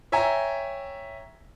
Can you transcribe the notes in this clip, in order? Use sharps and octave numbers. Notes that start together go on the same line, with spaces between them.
C#5 E5 G5 G#5 A#5